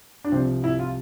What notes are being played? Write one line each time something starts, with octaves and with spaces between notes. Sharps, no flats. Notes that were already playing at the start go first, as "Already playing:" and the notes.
D4
C2 C3 F3 C4
E4
F4